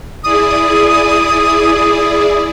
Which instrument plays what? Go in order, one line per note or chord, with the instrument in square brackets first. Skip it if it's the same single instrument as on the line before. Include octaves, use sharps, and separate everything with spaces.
[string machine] E4 G#4 D5 [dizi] D#6